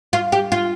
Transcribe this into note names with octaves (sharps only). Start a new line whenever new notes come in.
F4
G4
F4